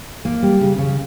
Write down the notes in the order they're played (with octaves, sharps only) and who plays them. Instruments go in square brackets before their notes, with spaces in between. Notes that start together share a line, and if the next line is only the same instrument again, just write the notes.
[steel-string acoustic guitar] A#3
G3
C#3
C#3